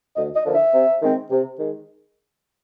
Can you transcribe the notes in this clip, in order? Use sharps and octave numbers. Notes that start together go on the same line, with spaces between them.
D2 D#5
D#5
D3 F3 A#3 D4
E5
C3
D#3 G#3 C4
C3
D#3 G#3